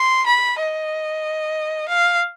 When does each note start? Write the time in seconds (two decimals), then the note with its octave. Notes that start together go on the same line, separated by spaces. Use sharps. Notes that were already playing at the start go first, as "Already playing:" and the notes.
Already playing: C6
0.26 B5
0.59 D#5
1.88 F5